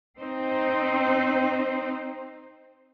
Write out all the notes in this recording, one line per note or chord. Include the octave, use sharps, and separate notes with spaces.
C4 D#4 C5